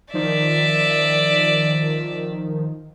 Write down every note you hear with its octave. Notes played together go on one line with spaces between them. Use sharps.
D#3 F3 D5 E5